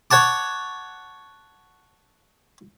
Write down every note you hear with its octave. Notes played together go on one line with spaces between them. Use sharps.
C#5 F#5 A5 D6